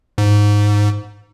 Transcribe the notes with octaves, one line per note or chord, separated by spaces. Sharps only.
G#2